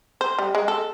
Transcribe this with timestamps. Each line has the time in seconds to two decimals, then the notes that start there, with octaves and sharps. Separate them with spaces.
0.21 C5
0.39 G3
0.55 G#3
0.68 A4